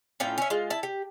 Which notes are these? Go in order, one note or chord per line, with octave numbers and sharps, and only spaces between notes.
A2 C#4 F4 G5
C#4 E5
G#3 F4
E4 A5
G4